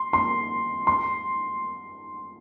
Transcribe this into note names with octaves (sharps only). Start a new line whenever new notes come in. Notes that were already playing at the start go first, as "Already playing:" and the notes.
Already playing: C6
C6
C6